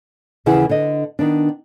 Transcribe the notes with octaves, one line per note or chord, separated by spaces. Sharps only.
D#2 C#3 E3 E4 G#4 F#5
D3 D#5
D#3 B3 D4